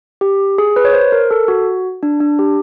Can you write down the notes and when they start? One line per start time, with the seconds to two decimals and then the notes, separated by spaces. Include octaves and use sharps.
0.21 G4
0.58 G#4
0.76 B4
0.85 C#5
0.93 C5
1.12 A#4
1.31 A4
1.48 F#4
2.03 D4
2.20 D4
2.39 G4